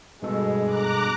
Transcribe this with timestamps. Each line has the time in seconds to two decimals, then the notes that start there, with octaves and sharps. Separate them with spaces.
0.23 G2 B2 G#3 A4
0.65 A#5 D6 F#6